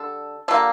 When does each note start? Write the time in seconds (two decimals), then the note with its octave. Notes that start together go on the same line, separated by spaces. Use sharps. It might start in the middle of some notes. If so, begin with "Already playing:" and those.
Already playing: D3 G3 A4
0.48 D3 G3 A#3 F4 A4